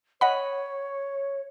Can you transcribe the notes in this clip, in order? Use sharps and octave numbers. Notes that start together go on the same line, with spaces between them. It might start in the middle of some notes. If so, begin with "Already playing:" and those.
C#5 D#5 F#5 B5